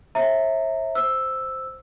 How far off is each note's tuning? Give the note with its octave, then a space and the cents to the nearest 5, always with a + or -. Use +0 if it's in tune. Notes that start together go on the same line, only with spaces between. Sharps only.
C#5 -45 E5 -15 A#5 -15
C5 -5 E6 +0